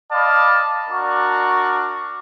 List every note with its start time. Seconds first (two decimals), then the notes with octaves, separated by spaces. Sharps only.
0.12 D5 D#5 F5 A5 B5
0.90 D4 F#4 A#4 D5 C#6